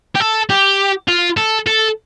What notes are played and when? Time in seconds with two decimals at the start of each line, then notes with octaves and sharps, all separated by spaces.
0.15 G4
0.20 A4
0.50 G4
1.08 F4
1.37 A4
1.67 A4